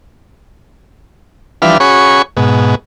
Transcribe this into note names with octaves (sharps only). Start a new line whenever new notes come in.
E3 F3 G3 D4 B4 F6
C#4 F#4 G#4 C#5 B5 C#6
G#2 B2